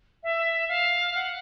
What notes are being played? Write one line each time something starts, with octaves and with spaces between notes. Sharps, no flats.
E5
F5
F#5